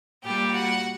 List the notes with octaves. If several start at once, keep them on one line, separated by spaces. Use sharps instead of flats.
A#2 G3 G4 G5
F#4 F#5